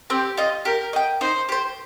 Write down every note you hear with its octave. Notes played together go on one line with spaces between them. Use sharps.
C4 G4
F4 D#5
G4 A#4
D#5 G5
D#4 C5
G4 C5